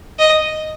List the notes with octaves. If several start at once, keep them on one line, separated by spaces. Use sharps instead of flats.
D#5